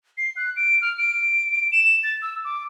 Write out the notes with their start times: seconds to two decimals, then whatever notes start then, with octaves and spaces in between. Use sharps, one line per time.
0.18 C7
0.36 F#6
0.56 D7
0.82 F6
0.98 D7
1.72 E7
2.03 A6
2.22 E6
2.44 D6